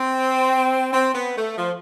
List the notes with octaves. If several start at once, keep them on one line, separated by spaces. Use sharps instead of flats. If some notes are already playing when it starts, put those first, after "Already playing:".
Already playing: C4
C4
B3
A3
F3